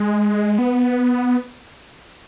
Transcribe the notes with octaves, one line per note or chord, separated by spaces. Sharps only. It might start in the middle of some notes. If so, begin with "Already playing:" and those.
Already playing: G#3
B3